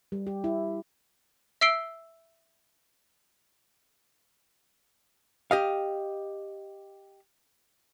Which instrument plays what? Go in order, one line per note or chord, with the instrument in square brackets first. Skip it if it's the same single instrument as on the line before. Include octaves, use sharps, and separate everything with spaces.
[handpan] G3
G4
E4
[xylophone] E5 E6 C7 D7 G7
[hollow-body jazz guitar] G4 D#5 F5